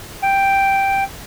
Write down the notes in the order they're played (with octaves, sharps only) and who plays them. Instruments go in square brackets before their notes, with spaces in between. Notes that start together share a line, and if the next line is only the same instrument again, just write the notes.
[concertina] G5